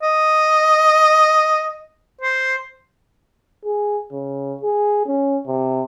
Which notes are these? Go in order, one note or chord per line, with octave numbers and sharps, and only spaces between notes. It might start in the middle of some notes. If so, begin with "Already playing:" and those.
D#5
C5
G#4
C#3
G#4
C#4
C3